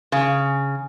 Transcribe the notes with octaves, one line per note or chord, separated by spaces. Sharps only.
C#3